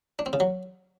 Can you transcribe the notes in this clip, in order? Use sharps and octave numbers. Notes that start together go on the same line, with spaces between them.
D4
C4
C#3
F#3